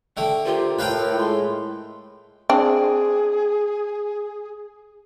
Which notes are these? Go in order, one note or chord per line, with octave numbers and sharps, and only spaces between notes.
D3 A3 G5
F4 G4 A#4 C5
A2 F4 B4 F5 G5
G#3 C6
C4 D4 G#4